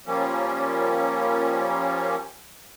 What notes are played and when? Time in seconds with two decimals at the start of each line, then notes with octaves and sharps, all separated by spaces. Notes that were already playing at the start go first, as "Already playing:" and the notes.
0.07 F3 G3 A#3 C#4